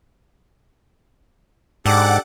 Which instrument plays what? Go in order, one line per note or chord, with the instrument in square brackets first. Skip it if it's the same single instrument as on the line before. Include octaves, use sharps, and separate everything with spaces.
[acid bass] G#2 [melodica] D4 G4 A4 [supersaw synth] F#5 D6